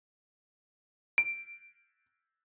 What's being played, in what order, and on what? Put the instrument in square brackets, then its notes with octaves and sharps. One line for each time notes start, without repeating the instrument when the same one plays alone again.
[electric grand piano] D7